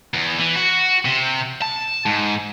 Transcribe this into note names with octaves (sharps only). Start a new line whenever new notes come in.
E2
E3
F#4
C3
A5
G#2